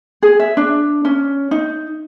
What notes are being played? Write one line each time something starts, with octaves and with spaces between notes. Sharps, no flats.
G#4
E5
D4
C#4
D#4